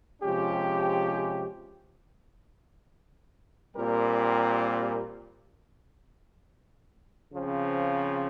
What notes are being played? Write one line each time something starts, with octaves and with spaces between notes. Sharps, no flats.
C3 F3 G#3 C#4 G4
A#2 G3 C4 G4 A#4
C#3 F3 C4